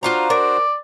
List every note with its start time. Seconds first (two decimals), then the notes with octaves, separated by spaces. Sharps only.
0.03 D4 F4 F#4 C5 F5 A#5
0.30 A#4 D5